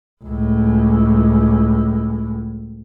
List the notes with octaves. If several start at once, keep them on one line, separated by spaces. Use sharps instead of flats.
C#2 A2